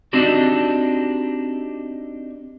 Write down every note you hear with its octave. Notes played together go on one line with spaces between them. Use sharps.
C4 D4 D#4 F#4 G4